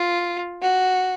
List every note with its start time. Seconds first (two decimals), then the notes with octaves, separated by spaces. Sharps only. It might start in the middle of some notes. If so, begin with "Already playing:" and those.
Already playing: F4
0.62 F#4